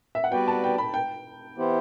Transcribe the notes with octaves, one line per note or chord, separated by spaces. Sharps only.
E5
F#5
G3 B3 F#4 B4 D5 G5
A5
G5
B5
G5
E3 B3 E4 G4 C5